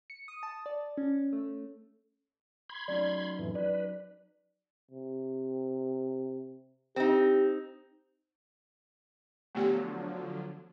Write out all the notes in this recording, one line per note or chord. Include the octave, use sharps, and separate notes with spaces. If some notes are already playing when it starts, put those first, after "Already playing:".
C#7
D#6
A5
D5
C#4
A3
B5 C6 G#6
F#3 C#4 D#4 D5
F2 A2 E3
B4 D5
C3
C4 D#4 G4
D3 F3 F#3 A3 B3 G4